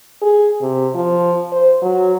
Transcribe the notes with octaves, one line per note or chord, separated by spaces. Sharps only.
G#4
C3
F3
C5
F#3